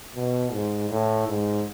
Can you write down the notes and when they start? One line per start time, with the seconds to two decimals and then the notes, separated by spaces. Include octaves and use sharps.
0.15 B2
0.52 G#2
0.90 A2
1.28 G#2